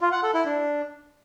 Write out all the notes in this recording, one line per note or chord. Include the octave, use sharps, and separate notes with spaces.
F4
F#5
A4
E4
D4